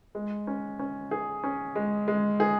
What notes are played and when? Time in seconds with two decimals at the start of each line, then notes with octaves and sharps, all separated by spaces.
0.15 G#3
0.47 C#4
0.79 C#4
1.11 G#4
1.44 C#4
1.76 G#3
2.08 G#3
2.40 G#4